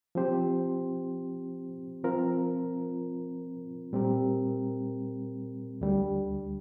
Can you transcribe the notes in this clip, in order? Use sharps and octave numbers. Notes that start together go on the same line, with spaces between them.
F3 C4 G4 C5
F3 C4 F4 A#4
A#2 G3 C4 G4 A#4
D2 D3 G3